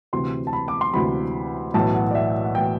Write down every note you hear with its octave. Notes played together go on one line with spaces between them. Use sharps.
D2 C3 E3 C6
A5
B5
D6
C6
D2 C3 E3 B5
B1 A2 E3 A5
F#5
D5
E5
F#5
A2 E3 G5